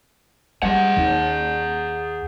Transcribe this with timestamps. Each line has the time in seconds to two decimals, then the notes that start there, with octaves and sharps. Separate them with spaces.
0.63 G3 G#4 F#5
0.97 D#2